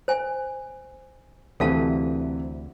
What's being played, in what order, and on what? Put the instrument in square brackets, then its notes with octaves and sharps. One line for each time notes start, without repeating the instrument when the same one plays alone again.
[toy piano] C5 G#5
[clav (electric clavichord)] D2 [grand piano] C3 E3 C4 [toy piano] A4 F5 A5